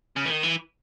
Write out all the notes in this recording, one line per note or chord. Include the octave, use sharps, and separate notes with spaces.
C#3
E3
D#3
E3